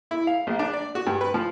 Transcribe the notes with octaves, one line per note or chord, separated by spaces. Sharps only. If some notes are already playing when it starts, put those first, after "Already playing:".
E4
F5
A#1
D4
D5
F#4
G2
B4
F3